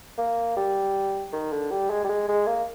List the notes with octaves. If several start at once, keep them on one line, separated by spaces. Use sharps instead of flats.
A#3
G3
D#3
D3
G3
G#3
G3
G#3
G#3
A#3